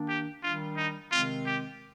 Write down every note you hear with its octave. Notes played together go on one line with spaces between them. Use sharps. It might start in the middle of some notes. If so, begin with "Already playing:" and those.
Already playing: D#3 A#3 D4
G4
D#3 G3 D4 F4
D#4
C3 D#3 G#3 C4 F4
G4